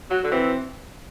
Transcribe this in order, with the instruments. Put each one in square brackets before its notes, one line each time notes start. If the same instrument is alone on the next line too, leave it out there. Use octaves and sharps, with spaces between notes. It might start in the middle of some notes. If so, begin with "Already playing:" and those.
[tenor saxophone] F#3 [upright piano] F#4
[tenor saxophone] D3
[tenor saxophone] E3 [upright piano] C4